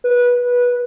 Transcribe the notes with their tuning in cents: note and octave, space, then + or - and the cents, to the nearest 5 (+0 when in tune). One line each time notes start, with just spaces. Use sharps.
B4 -15